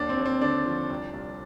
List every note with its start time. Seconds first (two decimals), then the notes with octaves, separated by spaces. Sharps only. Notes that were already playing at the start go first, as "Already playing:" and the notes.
Already playing: D#2 D4
0.09 C4
0.17 D#2
0.26 C4
0.41 D3 D4
0.66 F3
0.90 C2
1.14 C2